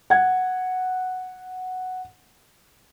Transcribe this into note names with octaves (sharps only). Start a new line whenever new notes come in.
F#5 G#6